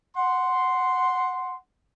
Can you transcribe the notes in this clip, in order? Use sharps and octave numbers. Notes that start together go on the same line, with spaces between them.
F#5 C6